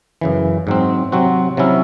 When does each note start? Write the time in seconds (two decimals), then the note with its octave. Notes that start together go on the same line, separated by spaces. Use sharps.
0.21 F#2 C#3 E3
0.67 G#2 F#3 C4
1.12 C3 F#3 C4 F#4
1.57 C3 F#3 C#4 E4